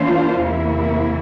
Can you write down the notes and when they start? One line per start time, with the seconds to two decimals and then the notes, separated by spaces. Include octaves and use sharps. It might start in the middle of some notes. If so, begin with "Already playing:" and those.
Already playing: E3 A#3 D4 F4 C5
0.41 E2 C3 E3 A#3 E4